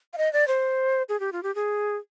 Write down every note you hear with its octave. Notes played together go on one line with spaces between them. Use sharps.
F5
D#5
D5
C5
G#4
G4
F4
G4
G#4